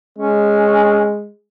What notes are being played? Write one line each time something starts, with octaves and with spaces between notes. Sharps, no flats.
G#3 C#4